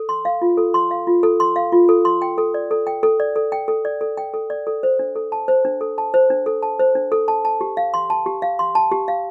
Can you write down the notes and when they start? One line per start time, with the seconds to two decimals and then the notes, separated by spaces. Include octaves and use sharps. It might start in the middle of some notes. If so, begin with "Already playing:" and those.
Already playing: A4
0.09 C6
0.25 F5
0.42 F4
0.58 A4
0.74 C6
0.91 F5
1.07 F4
1.23 A4
1.40 C6
1.56 F5
1.72 F4
1.89 A4
2.05 C6
2.22 G5
2.38 A4
2.54 D5
2.71 A4
2.87 G5
3.03 A4
3.20 D5
3.36 A4
3.52 G5
3.68 A4
3.85 D5
4.01 A4
4.17 G5
4.34 A4
4.50 D5
4.67 A4
4.83 C5
4.99 D4
5.16 A4
5.32 A5
5.48 C5
5.65 D4
5.81 A4
5.98 A5
6.14 C5
6.30 D4
6.46 A4
6.62 A5
6.80 C5
6.95 D4
7.12 A4
7.28 A5
7.45 A5
7.61 G4
7.77 F5
7.94 C6
8.10 A5
8.26 G4
8.42 F5
8.59 C6
8.75 A5
8.92 G4
9.08 F5